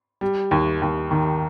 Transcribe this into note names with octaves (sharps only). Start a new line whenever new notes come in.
G3
D#2
D#2
D#3